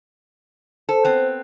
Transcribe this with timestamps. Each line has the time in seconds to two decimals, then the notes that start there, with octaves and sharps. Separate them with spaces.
0.89 A4 C5
1.04 B3 C4